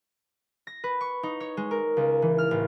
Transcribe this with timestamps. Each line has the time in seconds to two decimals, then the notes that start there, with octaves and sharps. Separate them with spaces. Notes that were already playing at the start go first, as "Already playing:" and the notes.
0.67 A#6
0.84 B4
1.01 C#6
1.23 D#4
1.40 C#5
1.57 G#3
1.71 A#4
1.97 C#2
2.22 E3
2.38 F6
2.51 A1